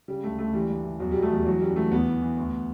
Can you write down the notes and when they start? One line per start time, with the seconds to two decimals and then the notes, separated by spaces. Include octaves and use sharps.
0.08 C#3 G3
0.24 D2 A3
0.39 D2 A3
0.54 E3 G3
0.70 G2
0.85 E3
1.00 E2 F#3
1.11 B2 G3
1.22 A3
1.30 E2 G3
1.45 E3 F#3
1.61 F#2 G3
1.76 E3 A3
1.91 E2 B3
2.07 E3
2.22 E3
2.37 D2